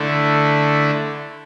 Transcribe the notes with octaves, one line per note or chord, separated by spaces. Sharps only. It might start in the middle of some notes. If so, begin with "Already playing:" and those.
Already playing: D3 A3 E4